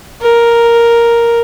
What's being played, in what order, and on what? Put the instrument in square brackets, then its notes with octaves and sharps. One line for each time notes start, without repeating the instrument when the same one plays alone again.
[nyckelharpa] A#4